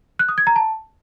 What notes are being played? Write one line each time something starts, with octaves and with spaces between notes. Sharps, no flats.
F#6
D#6
G#6
A#5
A5